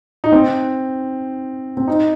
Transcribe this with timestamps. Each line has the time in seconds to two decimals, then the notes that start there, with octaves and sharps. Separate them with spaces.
0.24 D#4
0.32 C4
1.77 C4
1.87 D#4